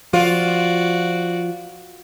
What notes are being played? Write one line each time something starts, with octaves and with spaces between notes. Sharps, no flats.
F3 F4 F#4 D5